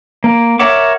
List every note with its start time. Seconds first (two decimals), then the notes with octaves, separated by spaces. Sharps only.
0.24 A#3
0.59 A#4 C#5 E5 F#5 D6